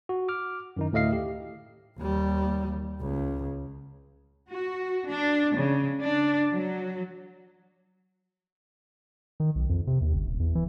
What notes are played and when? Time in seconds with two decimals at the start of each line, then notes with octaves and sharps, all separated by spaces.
0.09 F#4
0.29 D6 F6
0.77 F#2 D#3 D#4
0.92 D2 A2 A3 D#5 F5 C7
1.12 G4
1.98 D#2 G3
3.01 C#2
4.48 F#4
5.07 D4
5.55 C#3
6.00 D4
6.53 F#3
9.40 D#3
9.55 B1
9.69 F2
9.87 C3
10.01 D#2
10.14 G1
10.27 D#1
10.40 E2
10.55 E3